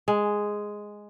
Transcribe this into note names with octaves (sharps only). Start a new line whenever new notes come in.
G#3